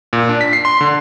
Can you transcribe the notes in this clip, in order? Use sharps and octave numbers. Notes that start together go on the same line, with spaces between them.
A#2
D4
B6
C7
C6
D3